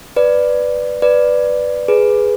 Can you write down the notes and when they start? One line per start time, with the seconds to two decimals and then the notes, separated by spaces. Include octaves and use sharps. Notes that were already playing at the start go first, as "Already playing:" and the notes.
0.16 B4 D5
1.02 B4 D5
1.88 G#4 B4